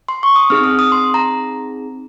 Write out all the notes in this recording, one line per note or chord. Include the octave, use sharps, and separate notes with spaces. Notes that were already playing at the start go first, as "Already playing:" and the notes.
C6
C#6
D#6
C4 D#4 G#4 F6
D#6
D#6
C6
A#5